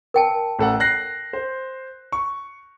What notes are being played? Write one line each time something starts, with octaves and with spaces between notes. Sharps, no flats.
A#4 G5 A5
A1 A4 F#5
F#6 A#6 C7
C5
C#6